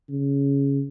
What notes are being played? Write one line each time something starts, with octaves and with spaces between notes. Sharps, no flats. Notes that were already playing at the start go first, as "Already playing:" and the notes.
C#3